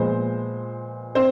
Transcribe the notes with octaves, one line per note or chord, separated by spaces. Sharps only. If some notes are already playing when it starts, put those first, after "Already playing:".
Already playing: A#2 F3 G#3 B3 C5
C4 C5